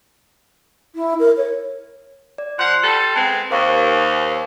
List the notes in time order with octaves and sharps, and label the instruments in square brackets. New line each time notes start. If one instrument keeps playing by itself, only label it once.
[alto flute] E4
A#4
C#5
[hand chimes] D5
[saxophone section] F3 F#5 [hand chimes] C6 C7
[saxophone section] G3 A4
G#3 B3 C4
[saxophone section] D#2 [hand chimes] C5 F5 C#6